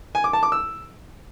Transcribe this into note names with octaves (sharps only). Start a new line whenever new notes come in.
G#5
D6
A5
D6
E6